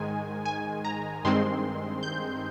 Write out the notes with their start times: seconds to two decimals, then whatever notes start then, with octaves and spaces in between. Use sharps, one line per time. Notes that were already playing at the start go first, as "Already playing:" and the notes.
Already playing: G#2 D#3 G#3 G#5
0.46 G#5
0.85 A#5
1.25 G2 D#3 G#3 C4 C6
2.03 G6